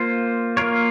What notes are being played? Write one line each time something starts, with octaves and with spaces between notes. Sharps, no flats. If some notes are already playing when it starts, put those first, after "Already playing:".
Already playing: A#3 F4 C5
A#3 F4 A#4 C#5